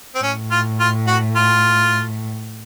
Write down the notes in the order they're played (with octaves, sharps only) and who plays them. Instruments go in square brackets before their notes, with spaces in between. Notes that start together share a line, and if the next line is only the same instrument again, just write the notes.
[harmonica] C4
[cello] A2 [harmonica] C#4
[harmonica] F4
F4
F#4
F4